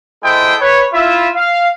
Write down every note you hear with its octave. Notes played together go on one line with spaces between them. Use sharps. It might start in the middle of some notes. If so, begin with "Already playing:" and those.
G#3 E4 A4 C5 D#5 G5
B4 C#5
E4 F4 E5
F5